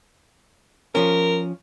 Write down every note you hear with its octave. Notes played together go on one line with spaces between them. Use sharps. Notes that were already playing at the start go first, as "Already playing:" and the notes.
F3 C#4 A#4